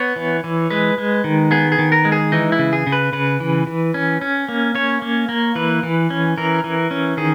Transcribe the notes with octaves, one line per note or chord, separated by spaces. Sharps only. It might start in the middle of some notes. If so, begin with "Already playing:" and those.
Already playing: B3 C#5
E3
E3
G#3 B4
G#3
D#3
B3 G#4
G#4
D#3
A#4
G#3
G#4
E3 D#4
E4
C#3
G#4
C#3
B4
C#3 B4
E3
E3
C#4
C#4
A#3
C#4 C#5
A#3
A#3
E3 B4
E3
C#4
E3 A#4
E3
C#4
D#3 G#4